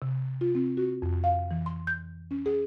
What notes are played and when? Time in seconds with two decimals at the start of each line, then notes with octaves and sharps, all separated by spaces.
0.02 C3
0.41 F4
0.55 C4
0.77 F#4
1.02 F2
1.24 F5
1.51 E3
1.66 C6
1.87 G6
2.31 C#4
2.46 G#4